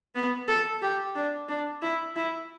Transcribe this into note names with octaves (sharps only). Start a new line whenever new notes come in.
B3
A4
G4
D4
D4
E4
E4